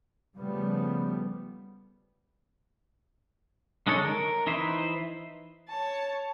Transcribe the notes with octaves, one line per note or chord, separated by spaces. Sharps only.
C#3 F3 G3 A3 B3
D3 G#3 D#4 A4 C#5
A#4
E3 D#4 E4 B4 C5
C#5 A5